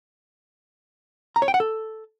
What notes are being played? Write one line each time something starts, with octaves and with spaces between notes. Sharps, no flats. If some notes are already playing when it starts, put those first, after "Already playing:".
A#5
C#5
G5
F#5
A4